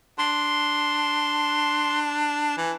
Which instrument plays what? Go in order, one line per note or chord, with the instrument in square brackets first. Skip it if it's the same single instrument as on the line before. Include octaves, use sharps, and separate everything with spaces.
[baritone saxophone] D4 [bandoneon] C6
[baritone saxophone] E3